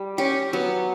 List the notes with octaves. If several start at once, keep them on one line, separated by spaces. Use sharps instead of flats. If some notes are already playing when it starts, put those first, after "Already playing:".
Already playing: G3
C#4 G4
F#3 B3